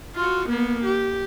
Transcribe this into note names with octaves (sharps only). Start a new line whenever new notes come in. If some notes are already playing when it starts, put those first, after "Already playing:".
F4 F#4
A#3 B3
G4